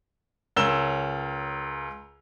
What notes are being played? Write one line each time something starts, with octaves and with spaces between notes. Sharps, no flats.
C#2 A#4 C#5 E6 E7 G7